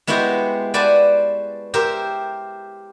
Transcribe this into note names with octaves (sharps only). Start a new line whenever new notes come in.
G#3 B3 E4 F#4 G4 C5
B4 C5 D5 F#5 G#5 A5
G4 A#4 C5 E5